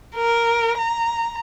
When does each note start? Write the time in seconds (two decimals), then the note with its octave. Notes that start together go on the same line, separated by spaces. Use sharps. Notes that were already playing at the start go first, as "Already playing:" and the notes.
0.15 A#4
0.78 A#5